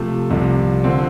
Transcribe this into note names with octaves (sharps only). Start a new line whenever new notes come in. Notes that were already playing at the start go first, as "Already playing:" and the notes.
Already playing: C3 F3 A3
C2 C3 F3
D3 F3 C4